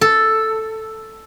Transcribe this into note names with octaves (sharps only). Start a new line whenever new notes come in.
A4